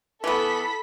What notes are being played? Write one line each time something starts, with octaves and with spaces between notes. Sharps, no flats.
E3 B3 A4 B5 B6